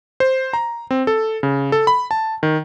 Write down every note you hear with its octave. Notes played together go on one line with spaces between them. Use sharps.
C5
A#5
C4
A4
C#3
A4
B5
A5
D#3